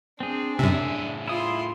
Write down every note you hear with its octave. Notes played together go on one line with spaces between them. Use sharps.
C4 D4 G#4
F#2 A2 C3 G#4 E5
E4 F4 C6 D#6